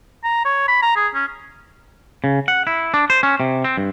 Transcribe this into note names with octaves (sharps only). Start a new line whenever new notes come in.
A#5
C#5
B5
A#5
G#4
C#4
C#3
F#5
E4
D4
C5
C#4
C3
C4
G2